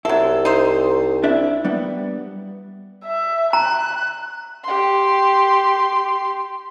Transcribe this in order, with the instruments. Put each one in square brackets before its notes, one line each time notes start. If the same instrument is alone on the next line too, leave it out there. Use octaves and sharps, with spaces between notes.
[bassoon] C2 [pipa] F#3 A4 [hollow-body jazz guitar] E4
[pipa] D#4 C5
[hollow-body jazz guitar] D4 E4 E5
G3 B3
[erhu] E5
[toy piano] A#5 [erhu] F#6
[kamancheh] G4 C6